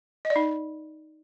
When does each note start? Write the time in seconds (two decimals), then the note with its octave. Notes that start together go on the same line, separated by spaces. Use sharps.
0.25 D#5
0.30 D5
0.36 D#4